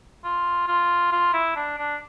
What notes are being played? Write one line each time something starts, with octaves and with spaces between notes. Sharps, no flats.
F4
F4
F4
E4
D4
D4